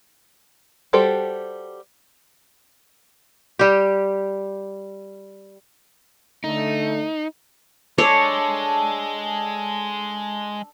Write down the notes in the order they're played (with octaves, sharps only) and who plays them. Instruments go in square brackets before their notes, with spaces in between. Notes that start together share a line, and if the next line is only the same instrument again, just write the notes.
[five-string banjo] G3 F#4 G4 A4 C5
[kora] G3 G4
[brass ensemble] D3 A3 [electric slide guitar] D#4
[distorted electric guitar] G#3 [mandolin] D4 A4 [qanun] C#5